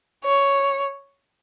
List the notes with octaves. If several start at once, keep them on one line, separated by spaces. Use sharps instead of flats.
C#5